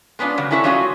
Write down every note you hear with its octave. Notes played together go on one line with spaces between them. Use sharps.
G#3 B3 C#4 D4 F4
C#3 F#3 G3 B3
C#4 D4 E4 A4 B4 C#5
G3 C4 C#4 F4 F#4 G#4